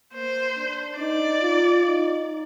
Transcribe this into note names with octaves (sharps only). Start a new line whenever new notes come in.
A#3 C5
D4
D#4 D5
F4
D#4